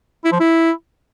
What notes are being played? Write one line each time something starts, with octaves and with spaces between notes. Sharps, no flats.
E4
F3
E4